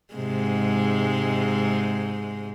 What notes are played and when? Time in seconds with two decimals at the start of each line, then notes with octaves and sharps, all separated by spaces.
0.14 G#2 C3 G#3